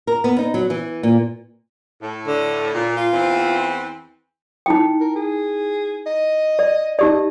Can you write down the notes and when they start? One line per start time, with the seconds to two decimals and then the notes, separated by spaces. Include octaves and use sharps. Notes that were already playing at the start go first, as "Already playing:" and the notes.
0.07 A#4
0.24 B3
0.39 D#4
0.54 F#3
0.70 E3
1.03 A#2
2.02 A2
2.27 D3
2.75 A#2
2.97 F4
3.12 E2 E3 C4
4.66 D#4 E4 G5
5.01 A#4
5.16 G#4
6.06 D#5
6.59 D5
6.99 D#4 G4 D5 D#5